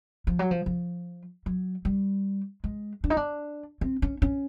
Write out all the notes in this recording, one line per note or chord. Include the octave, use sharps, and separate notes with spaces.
F3
F#3
F3
F3
F#3
G3
G#3
D4
D#4
D4
C4
C#4
C#4